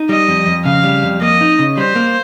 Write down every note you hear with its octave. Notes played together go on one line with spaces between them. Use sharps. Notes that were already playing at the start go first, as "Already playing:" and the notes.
Already playing: D#4
G3 D#5
F2
F2
C#3 F5
G3
F2
A#3 D#5
D#4
C#3
G3 C5
A#3